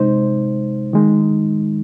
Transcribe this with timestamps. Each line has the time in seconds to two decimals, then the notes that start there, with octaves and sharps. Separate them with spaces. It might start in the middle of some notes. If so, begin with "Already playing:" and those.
Already playing: C3 G#3 D#4 C5
0.93 D#3 G#3 D#4